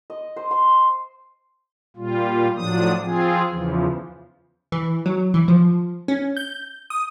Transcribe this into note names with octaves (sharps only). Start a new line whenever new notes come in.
D#5
C5
C6
A#2 G3 F4
A2 F3 F#3 D4 D#6
F3 C4 F4 G#4
E2 C#3 E3 F3
E3
F#3
E3
F3
C#4
G6
D#6